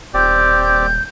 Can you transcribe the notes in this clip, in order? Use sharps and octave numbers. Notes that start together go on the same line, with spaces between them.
D#1 C4 G4 D5 G6